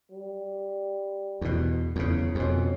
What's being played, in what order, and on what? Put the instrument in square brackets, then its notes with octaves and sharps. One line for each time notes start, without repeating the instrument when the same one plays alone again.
[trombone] G3
[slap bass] E2 B2
E2 C#3
[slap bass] F2 B2 [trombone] C#4